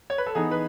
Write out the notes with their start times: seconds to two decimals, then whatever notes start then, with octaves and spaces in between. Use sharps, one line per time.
0.10 C#5
0.18 B4
0.27 A4
0.35 E3 B3 D#4 G#4
0.51 B4